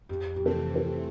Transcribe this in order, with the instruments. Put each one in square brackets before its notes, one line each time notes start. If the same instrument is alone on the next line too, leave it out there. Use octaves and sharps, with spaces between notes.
[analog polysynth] F2 [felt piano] G4
[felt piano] G4
[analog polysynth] C3 E3 A3 C4 [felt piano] A4
[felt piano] A4
[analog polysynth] F2 [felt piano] G4